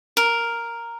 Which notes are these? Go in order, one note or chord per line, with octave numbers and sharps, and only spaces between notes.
A#4